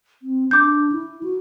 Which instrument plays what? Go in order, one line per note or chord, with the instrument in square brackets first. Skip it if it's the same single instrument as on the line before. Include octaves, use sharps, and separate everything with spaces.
[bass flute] C4
[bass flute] D4 [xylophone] D6 G6
[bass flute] E4
F#4